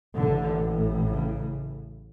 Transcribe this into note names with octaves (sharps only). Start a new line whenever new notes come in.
A1 A2 D3
C#3